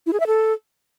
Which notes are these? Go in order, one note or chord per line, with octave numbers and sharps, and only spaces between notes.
E4
G#4
E5
A4